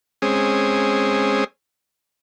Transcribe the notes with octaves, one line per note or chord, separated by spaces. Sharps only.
G#3 C4 C#4 G#4